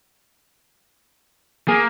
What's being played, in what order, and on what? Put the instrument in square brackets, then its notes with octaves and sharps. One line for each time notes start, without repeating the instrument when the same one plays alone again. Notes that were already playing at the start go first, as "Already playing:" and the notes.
[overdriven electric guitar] A#3 [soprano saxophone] G#4